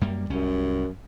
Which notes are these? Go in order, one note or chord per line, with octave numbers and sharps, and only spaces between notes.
F#2 G3 A#3
C2 F#2 G3 C#4